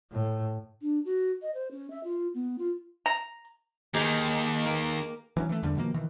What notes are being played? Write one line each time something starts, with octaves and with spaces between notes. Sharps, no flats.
A2
D4
F#4
D#5
C5
C#4
E5
F4
B3
F4
A#5
D#2 D#3 D#4 G4 G#4
A#3
E3 F#3 C#4
E3 A3
E2 G2 D3 G3
B2 D#3 F3 A#3
B2 D#3 E3